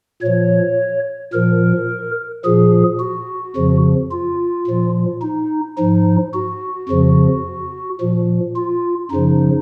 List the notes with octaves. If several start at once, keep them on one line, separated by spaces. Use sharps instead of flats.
A#2 F3 C#5
A#2 F3 A#4
A#2 F3 G#4
F#4
F2 C#3 F3
F4
A#2 F3
D#4
G#2 F3 D#4
F#4
F2 C#3 F3
A#2 F3
F4
F#2 C#3 F3 D#4